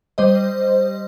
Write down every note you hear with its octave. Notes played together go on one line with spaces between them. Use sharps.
G3 C5 D#5